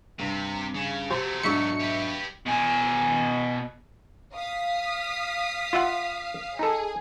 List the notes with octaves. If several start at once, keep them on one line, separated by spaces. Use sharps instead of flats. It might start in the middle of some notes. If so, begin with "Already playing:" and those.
G2 C3
C#3
C2 F#3 A3 G4 C5
B1 G#2 D4 E5 C#6 C#7
G4 B4
B2 G#5
F5 D#6 B6
F4 E5 F#5
D#4 G#4 A4